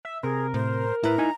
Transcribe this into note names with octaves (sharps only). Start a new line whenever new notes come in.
E5
C3 G#4 A#4
A2 C5
A2 E4 B4 A#5
D#4 G#5